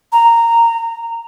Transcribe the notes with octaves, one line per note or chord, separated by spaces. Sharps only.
A#5